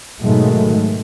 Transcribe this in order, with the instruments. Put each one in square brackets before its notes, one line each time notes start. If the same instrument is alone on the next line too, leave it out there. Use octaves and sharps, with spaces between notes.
[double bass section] G#2 B2 D#3 F#3 G#3 A3